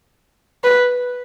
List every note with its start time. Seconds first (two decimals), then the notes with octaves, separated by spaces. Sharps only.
0.64 B4